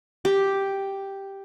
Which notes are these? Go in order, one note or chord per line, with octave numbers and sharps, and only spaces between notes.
G4